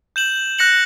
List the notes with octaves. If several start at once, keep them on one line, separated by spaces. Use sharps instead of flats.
G6 E7 F#7
F#6 A#6 C#7 F#7